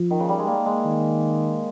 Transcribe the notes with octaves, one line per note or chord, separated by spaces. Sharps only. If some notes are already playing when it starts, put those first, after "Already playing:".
Already playing: F3
D#3
C#3
G3
G#3
A#3
G#3
D#3